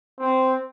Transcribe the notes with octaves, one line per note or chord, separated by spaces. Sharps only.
C4